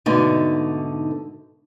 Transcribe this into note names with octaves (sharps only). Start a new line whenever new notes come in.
G#2 B2 D3 A3 D#4